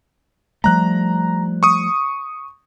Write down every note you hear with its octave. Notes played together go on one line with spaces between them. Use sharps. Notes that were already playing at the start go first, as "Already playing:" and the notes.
F3 G3 A3 A#5 F#6
C#6 D#6